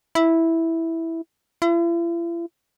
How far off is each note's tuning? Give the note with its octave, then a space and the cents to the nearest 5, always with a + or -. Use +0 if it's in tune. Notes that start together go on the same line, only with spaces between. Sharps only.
E4 -5
E4 +45